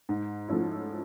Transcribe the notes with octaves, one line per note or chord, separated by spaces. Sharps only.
G#2
F3 A3 C#4 E4